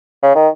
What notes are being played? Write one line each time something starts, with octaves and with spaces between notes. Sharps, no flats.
C#3
D#3